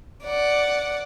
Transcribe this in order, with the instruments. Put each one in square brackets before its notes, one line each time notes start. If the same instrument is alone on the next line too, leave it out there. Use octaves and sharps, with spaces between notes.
[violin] D5 F#5